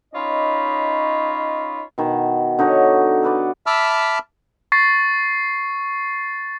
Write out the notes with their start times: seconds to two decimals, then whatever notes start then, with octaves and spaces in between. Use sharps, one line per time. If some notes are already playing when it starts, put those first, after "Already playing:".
0.14 C#4 D#4 F4 C#5 D#5 B5
1.98 B2 D#3 A5
2.59 D3 D#4 F#4 C#5
3.23 A4 B4 D5
3.66 E5 A5 B5 D6 E6 F6
4.72 C#6 A6 C7